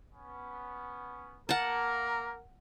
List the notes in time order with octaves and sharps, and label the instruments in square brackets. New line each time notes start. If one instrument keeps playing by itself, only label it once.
[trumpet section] B3 C#4
[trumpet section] A#3 [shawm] A#4 [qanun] F#5 A5